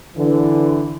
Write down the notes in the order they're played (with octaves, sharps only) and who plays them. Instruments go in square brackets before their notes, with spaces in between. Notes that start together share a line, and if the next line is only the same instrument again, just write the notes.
[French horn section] D3 E3